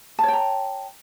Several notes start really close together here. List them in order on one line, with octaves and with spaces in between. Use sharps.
A5 C#5 G5 A#5